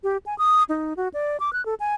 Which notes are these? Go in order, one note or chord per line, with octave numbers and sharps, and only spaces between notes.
G4
G#5
D#6
D#4
F#4
D5
D6
F#6
A4
G#5